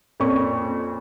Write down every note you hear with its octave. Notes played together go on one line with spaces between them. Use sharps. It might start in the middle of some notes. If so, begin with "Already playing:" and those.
F2 A#2 C#4 D5 C#6